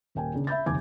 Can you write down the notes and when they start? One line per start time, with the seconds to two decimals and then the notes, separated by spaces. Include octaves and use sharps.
0.15 D#1 A#3 G5 G#5
0.34 C#3 D4
0.47 E5 B5 G6 A6
0.66 F1 D#2 C#3 G#5 D6 G#6